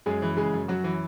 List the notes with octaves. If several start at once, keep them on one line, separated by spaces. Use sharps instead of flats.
F#2 G#3 G#4
E3
C#3 G#3 G#4
F#2
F#2 F#3 F#4
E3